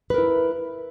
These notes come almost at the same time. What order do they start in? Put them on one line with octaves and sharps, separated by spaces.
B4 A#4 E4